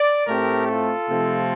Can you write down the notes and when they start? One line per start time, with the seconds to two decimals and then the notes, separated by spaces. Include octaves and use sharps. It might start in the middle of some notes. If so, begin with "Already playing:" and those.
Already playing: D5
0.26 A2 A3 C4 G4 A#4
0.68 F4 A4
1.09 C3 F3 A3 C4